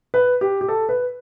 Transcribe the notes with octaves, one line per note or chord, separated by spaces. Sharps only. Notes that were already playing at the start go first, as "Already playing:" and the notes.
B4
G4
G4
A4
B4